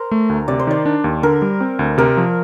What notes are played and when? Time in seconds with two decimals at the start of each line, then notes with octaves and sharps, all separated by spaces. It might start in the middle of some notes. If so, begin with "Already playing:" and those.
Already playing: A#4 C5
0.11 A3
0.30 D2
0.48 C3 D5
0.59 C5
0.67 D#3 D5
0.86 D4
1.04 D#2
1.23 D3 A#4
1.42 G3
1.61 C4
1.79 D2
1.98 C3 A#4
2.17 F3